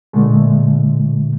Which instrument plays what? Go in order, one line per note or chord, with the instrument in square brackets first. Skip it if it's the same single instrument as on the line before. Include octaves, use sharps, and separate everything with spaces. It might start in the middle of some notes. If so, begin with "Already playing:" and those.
[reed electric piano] A#2 D3 G#3 A3